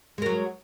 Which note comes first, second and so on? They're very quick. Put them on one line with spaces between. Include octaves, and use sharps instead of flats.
G#3 A#4 F#3